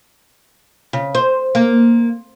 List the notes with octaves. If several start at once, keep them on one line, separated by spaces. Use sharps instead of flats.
C#3
C5
A#3